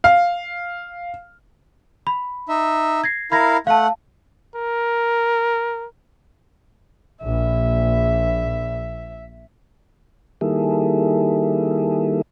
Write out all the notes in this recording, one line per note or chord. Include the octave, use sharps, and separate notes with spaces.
F5
B5
D#4 E5
G#6 A#6 C7
E4 A#4 F5 B5 G#6 A#6
A3 F5 F#5 A5
A#4
A#1 E5
D#3 G3 A#3 E4 G#4 A4